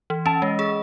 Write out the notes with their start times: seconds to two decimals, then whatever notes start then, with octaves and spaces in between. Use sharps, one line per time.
0.10 E3
0.26 C#4 A5
0.42 G#3 D#5
0.59 G#4